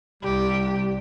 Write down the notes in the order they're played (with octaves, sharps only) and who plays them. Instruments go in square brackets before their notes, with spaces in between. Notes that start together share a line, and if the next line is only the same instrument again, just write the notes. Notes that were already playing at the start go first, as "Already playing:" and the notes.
[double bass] C2 [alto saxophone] G3 [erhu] G4